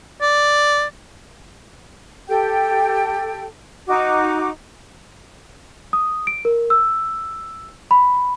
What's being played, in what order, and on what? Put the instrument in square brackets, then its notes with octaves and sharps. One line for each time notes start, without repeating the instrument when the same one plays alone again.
[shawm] D5
[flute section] G4 A4 G5
D#4 F#4 D6
[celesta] D#6
D7
A#4
E6
B5